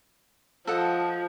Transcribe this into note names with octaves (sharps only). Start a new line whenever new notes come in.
F3 A4 D#5 F#5